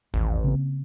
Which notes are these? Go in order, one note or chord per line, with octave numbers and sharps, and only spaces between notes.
E1 A1 D#2
C#3 A#3 C4